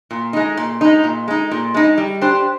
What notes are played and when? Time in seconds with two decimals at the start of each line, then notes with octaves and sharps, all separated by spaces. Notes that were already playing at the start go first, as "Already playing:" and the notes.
0.11 A#2
0.33 G#3 D#4
0.57 A#2
0.81 G#3 D#4
1.04 A#2
1.28 G#3 D#4
1.51 A#2
1.74 G#3 D#4
1.98 G3
2.21 D4 G4 C5